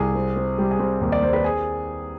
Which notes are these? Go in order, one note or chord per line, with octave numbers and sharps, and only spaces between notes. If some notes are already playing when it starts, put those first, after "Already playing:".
Already playing: C2 G#4
C4
C4
G3
G#4
C4 G4
D#2
D5
C4 C5
B4
G#4